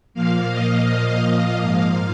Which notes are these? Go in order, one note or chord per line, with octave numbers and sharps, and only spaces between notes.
A#2 F3 A#3 F5
D#5
D#5
F5
G#2 F3 A#3